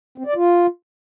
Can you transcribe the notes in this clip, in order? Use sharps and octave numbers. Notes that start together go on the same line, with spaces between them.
C4
D5
F4